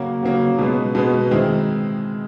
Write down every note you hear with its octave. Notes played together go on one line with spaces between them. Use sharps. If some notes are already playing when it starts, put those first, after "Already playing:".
Already playing: C#3 F#3 A#3 C#4 F#4
C#3 F#3 A#3 C#4 F#4
B2 G#3 B3
B2 G#3 B3
D#3 G#3 C4 E4